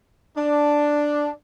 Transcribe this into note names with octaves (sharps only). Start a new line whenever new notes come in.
D4